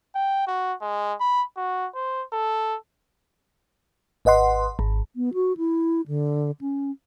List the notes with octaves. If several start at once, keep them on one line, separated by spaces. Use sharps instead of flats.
G5
F#4
G#3
B5
F#4
C5
A4
G#1 B4 D#5 F#5 C6
G#1
B3
F#4
E4
D3
C#4